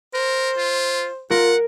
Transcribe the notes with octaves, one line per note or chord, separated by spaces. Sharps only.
A#4 C5
F4
F4 A#4 F#5